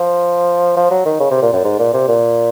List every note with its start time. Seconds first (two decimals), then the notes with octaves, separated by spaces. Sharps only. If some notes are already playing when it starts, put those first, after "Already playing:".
Already playing: F3
0.76 F3
0.91 F#3
1.05 D#3
1.20 C#3
1.31 C3
1.42 A#2
1.53 F#2
1.64 G#2
1.79 A#2
1.93 C3
2.08 A#2